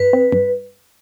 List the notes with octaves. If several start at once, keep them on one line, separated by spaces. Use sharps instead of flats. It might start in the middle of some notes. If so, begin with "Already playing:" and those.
Already playing: G2 B4
C4
G2